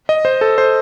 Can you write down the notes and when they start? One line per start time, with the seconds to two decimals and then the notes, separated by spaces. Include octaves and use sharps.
0.09 D#5
0.25 C5
0.41 A4
0.58 C5